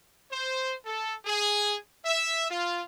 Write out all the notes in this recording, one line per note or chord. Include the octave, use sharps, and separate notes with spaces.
C5
A4
G#4
E5
F4